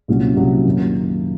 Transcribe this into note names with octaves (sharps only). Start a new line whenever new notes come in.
C2 A#2 F#3 C#4 F#4
C2 A#2 F#3 C#4 F#4
F#2 D#3 A#3